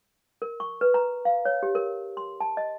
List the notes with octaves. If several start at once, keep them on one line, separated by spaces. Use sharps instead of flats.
A#4
C#6
B4
A#5
F5
C#5
G4
A#4
C6
A5
D#5